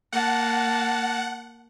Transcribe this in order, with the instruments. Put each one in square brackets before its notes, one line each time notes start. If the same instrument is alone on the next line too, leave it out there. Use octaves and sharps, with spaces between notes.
[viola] A#3 A5 [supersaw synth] F#5